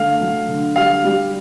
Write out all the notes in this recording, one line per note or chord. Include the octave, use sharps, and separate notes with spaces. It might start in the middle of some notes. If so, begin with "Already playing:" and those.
Already playing: D3 A3 F5
F#3
D3
G3 F5
G3